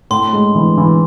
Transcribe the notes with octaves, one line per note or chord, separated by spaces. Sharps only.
A2 C6
G#3
E3
E3